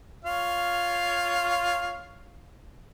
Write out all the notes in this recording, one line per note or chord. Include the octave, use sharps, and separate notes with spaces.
F4 C#5 F5